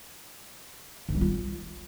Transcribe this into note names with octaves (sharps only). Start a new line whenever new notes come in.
D#3
G3
F4